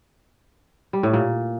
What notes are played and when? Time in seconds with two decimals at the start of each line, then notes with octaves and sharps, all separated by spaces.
0.93 G3
1.03 A2
1.13 A#2